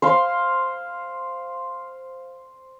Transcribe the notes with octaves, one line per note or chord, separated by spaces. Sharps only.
C5 F5 C6